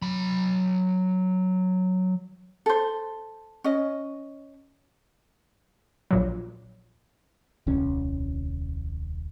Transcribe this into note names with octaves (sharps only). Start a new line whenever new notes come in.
F#3 B5
A4 C5
C#4 D#5
A#1 A#2 F#3
D#1 C2 C#4